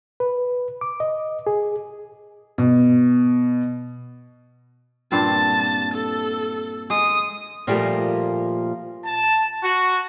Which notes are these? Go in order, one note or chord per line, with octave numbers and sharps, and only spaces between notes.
B4
D6
D#5
G#4
B2
G2 A#2 C4 A5
A4
G#3 D#6
A#2 F3 G3 A3 A#3 G4
A5
F#4